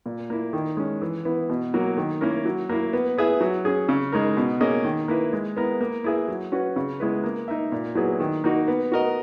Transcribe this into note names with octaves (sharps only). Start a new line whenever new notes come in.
A#2
A#3 E4
D#3
G#3 C#4
E3
B3 E4
B2
F#3 A#3
D#3
A#3 C#4 E4 A#4
F#3
A#3 E4
B3
E4 G#4 B4 E5
F#3
C#4 G#4
C#3
G#3 D#4 A#4
B2
A#3 C#4 G#4 D#5
D#3
A#3 E4 B4
G#3
B3 E4 A#4
A#3
E4 G#4 B4 E5
F#3
C#4 F#4 B4
C#3
G#3 B3 E4 B4
A#3
D#4 A#4 E5
A#2
F#3 B3 E4 G#4
D#3
A#3 D#4 F#4
B3
F#4 A#4 D#5